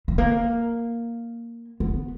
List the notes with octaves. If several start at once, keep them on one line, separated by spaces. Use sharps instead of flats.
G#3
A#3
B3